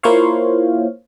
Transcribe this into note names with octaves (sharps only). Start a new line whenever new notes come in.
A#3 E4 F4 C5 C#5 F5